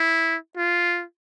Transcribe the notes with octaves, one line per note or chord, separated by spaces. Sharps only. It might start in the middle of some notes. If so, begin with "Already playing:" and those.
Already playing: E4
F4